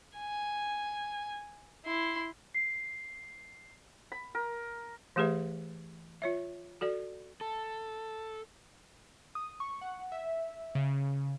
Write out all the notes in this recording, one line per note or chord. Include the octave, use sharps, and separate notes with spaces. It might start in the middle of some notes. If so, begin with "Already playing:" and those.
G#5
E4 C6
C7
B5
A#4
E3 A3 G4 G#4 B4 E5
F4 C#5 E5
F#4 A4 D5
A4
D#6
C#6
F#5
E5
C#3